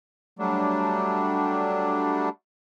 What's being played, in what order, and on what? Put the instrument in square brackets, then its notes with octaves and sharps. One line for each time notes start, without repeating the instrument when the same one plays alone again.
[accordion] F#3 G3 A3 D4